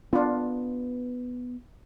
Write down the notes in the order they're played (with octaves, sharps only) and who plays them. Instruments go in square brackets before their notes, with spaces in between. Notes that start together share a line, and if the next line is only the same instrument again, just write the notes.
[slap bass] B3 [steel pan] D4 F4